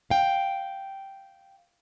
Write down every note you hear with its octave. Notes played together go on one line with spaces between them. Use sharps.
F5 G5